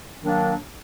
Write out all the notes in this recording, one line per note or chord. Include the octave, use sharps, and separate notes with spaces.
D#3 F#3 A#3 D4